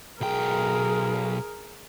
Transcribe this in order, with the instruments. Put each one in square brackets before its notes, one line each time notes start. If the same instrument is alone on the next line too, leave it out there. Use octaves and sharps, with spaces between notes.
[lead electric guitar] B1 G5 [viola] G#4 A#4